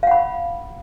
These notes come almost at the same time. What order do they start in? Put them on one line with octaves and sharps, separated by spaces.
F5 F#5 B5